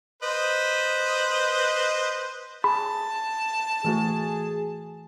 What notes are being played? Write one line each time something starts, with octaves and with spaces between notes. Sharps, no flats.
B4 C5 D#5
G#4 A5 B5
E3 A3 F#4 G#4